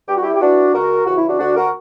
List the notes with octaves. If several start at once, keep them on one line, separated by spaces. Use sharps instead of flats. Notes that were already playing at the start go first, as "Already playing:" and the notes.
G2 G4
F#4
E4 G4
G4
E3 D4 F#4
C#2 F#4 A#4
C#3 E3 F#4
E4
D4 F#4
D2 D4 F#4
F#4 A#4